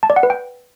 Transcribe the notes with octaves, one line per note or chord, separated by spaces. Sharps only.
A5
D5
F#5
B4
G5